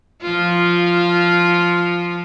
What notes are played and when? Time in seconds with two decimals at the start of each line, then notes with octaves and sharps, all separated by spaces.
0.22 F3 F4